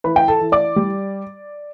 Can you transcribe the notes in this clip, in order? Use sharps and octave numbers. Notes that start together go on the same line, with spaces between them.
E3 B4 B5
G5
A4 A5
E3
D5 D6
G3